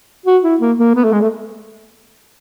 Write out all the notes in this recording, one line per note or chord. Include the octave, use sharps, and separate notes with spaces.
F#4
E4
A#3
A#3
B3
A3
G#3
A3